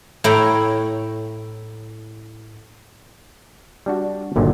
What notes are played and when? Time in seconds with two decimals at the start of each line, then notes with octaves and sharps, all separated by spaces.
0.24 A2 E4 C#5 G5 A#5
3.86 G3 D4 F#4
4.36 G1 A#2 D3 D#3 F#3